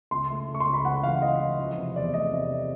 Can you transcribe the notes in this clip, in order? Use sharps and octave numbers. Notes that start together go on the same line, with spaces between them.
C#2 C6
A3
A3
C#6
C6
C#2
B5
C#2 F#5
E3 F5
E3 D#5
E3
F3
C3
E2 D5
A3 D#5
C3